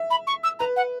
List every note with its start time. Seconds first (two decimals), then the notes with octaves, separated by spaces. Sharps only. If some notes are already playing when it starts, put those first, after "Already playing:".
Already playing: E5
0.10 B5
0.27 C#6
0.43 E6
0.59 B4 A#5
0.76 F#5